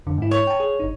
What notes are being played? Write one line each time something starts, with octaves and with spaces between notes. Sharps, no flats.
F2 D3
G#2 E4
C#5
G5 A5
G#4
G1 D#4